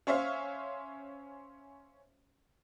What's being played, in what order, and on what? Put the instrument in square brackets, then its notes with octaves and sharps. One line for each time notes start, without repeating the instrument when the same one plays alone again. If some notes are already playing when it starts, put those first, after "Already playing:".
[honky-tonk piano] C#4 C5 C#5 E5 F5